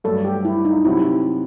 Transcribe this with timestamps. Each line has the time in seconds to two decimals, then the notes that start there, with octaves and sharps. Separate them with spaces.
0.04 G2 F#3 A3 A4
0.24 G4
0.45 E4
0.65 D#4
0.85 C3 F#3 C4 E4 F#4